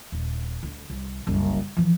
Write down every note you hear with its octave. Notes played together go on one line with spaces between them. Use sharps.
D#1
D2
C2
F#1 C2
E3 F3